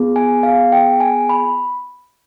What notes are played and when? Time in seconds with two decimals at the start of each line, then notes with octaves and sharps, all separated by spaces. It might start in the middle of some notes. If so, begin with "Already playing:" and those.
Already playing: B3 F4 G#4
0.16 G#5
0.43 F5
0.72 G5
1.00 G#5
1.29 B5